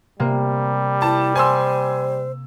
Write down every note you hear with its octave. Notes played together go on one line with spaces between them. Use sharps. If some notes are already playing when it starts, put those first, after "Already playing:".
C3 G3 A#3
E4 A5
C5 G#5 C6 E6